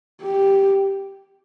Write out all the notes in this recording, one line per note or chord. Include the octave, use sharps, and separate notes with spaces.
G4